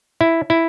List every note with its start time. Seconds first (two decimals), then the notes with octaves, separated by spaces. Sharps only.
0.21 E4
0.50 E4